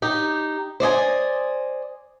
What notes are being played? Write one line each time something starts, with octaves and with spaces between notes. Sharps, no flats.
D#4 G4
C5 D5 D#5 G#5